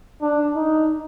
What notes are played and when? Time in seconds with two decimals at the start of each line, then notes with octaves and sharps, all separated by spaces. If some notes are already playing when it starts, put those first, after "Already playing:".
0.22 D4
0.56 D#4